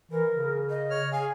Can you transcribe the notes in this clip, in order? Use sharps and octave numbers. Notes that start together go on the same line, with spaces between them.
E3 A#4
C#3
D#5
C#5 F6
G#4 F5 G#5